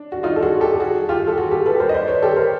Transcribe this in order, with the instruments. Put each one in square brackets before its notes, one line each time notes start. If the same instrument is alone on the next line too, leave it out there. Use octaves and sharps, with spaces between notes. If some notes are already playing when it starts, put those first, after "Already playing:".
Already playing: [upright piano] D4
F#4
D#4 F4
A4
F#4 G#4
G4 A4
G4
F#4 G#4
F4 G4
A4
F#4 G#4
G4 A4
A4 B4
A#4 C5
D#5
C5 D5
B4 C#5
G4 A4
A#4 C5